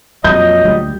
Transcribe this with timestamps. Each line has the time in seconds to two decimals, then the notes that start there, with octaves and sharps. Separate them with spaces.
0.24 F2 A#2 F#3 G3 D#5 G6
0.64 D2 G3